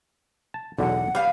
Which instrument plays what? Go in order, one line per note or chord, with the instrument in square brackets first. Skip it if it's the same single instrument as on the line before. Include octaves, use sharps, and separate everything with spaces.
[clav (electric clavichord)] A5
[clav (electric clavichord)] B1 E2 D3 [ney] F#5
[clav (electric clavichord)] G3 [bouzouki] B3 F5